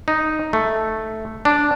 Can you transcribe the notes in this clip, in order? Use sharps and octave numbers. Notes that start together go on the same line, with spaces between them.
D#4
A3
D4